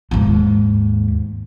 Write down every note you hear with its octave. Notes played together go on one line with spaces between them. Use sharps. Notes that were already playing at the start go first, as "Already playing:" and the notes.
D#2 G#2